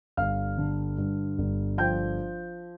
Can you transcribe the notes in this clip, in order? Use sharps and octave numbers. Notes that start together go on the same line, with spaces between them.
G1 F5 F6
D3
G2
G1
F3 G5 G6